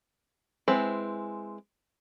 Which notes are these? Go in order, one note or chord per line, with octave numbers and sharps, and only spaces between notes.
G#3 C4 E4 B4 C5